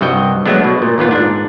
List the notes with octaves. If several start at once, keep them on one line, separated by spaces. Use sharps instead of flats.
C2 G2 F#4 D#5 G5
F#3 G#3 A3 B3 D4
B2
A#2
D#2 A#2 B3 F4
G#2 D4